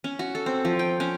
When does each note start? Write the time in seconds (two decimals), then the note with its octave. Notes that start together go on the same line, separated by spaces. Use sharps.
0.04 C#4
0.19 F#4
0.35 A4
0.46 C4
0.65 F3
0.79 G5
1.00 C#4